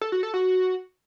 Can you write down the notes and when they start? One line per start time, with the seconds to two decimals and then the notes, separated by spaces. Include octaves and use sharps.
0.01 A4
0.12 F#4
0.23 A4
0.34 F#4